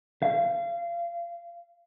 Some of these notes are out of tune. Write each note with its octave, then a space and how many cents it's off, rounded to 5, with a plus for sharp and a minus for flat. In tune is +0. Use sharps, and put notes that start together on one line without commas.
F5 -30